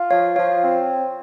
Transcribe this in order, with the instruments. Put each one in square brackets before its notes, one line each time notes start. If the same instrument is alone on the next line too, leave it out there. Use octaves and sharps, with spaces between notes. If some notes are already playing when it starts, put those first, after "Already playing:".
Already playing: [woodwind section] F4
[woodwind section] F3 [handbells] C#5 F5
[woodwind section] F3 [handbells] C#5 F5
[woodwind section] C4